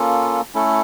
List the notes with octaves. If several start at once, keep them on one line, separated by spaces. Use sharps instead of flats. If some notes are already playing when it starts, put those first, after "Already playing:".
Already playing: A#3 C#4 F4 A4
A3 C#4 E4 A4